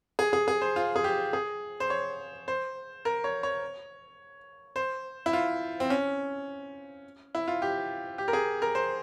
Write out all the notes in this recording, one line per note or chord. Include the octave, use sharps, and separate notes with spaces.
G#4
G#4
G#4
C5
F4
G#4
G4
G#4
C5
C#5
C5
A#4
C#5
C#5
C5
E4
F4
C4
C#4
E4
F4
G4
G4
A#4
G#4
A#4
C5